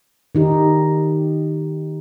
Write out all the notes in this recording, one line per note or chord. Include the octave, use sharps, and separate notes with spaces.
D#3 D#4 G4